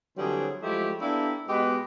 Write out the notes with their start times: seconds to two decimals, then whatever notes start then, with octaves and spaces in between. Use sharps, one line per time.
0.17 D3 E3 F#3 G3 C4 G#4
0.62 F3 F#3 G#3 A3 E4 G4
1.01 A#3 B3 D4 E4 G4 A4
1.48 B2 G#3 B3 G4 B4 D#5